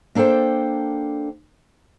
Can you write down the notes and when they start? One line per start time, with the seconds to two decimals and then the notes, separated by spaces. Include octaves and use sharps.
0.15 A#3 D4 A4 C5 G5